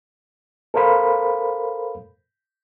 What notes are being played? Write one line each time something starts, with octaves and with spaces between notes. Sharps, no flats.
A4 A#4 C5 F5 B5